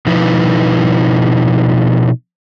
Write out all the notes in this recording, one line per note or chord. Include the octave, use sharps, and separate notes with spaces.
B2 F3 D#4 E4 B4